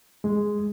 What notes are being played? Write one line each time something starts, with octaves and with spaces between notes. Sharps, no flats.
G#3